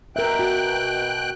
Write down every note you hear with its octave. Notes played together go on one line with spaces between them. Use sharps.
B2 A#4 E5 G5 F#6
F#4